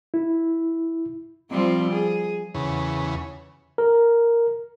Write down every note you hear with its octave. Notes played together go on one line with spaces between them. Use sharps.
E4
F3 G3 C4
G#4
E2 C#3
A#4